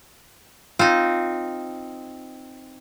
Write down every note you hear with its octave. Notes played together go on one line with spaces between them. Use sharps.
C4 D#4 F4